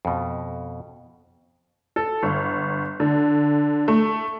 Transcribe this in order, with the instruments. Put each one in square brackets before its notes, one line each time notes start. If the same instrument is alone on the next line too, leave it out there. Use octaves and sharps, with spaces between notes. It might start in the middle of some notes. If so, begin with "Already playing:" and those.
[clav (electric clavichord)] F2 B2
[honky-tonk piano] A4
G1
D3
A3